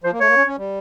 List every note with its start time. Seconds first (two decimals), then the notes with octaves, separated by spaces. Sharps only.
0.04 F3 C5
0.12 A#3
0.20 A3 C#5
0.28 A#3
0.36 C#4
0.47 C#4
0.58 G3